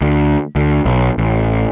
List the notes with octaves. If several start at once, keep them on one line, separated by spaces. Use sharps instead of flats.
D2
D2
B1
A1